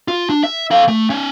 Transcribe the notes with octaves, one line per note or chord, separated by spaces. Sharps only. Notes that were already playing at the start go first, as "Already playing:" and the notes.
F4
D4
E5
A4 F5
A3
C#4 D#4